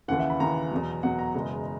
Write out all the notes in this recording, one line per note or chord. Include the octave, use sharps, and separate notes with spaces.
D#2 C#3 E3 F#5
E5
B5
D#2 C#3 E3 A#5
E2 B2 F#3
E2 B2 F#3 F#5
A#5
F#1 E2 B2 G#3